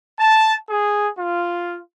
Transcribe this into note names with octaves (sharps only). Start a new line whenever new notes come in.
A5
G#4
F4